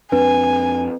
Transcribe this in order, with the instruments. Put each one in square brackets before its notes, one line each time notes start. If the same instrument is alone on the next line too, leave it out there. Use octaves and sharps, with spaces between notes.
[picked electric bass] F2 C4 D4 [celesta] B4 [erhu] G#5